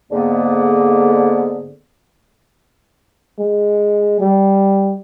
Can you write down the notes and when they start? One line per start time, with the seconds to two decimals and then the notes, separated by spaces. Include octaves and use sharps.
0.12 G#2 D3 A#3 B3
3.39 G#3
4.20 G3